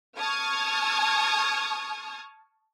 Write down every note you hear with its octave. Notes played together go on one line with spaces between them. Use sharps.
A5 C#6 D#6 F6 G#6